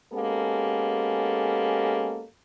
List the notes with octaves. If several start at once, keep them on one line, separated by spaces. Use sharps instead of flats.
G#3 A#3 B3 C#4 G4 A4